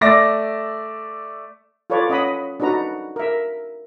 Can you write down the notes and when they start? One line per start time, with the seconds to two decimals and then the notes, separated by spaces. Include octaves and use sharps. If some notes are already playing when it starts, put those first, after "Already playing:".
0.01 A3 D5 E5 D6 A#6
1.90 F4 A4 B4 C#5 D5
2.10 C#4 D#5 F#5 B5 D#6
2.60 D4 D#4 F#4 B4 A#5
3.16 A#4 E5